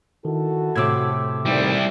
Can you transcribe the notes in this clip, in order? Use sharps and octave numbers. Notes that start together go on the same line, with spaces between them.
D#3 E4 F#4 A4
A2 C3 D6 E6 G#6
D2 D#3 G3 C4 E4